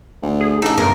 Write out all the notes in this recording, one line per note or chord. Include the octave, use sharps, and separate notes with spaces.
D2
G#4
A1 C#3 D#4 A4
G1 G2 A#4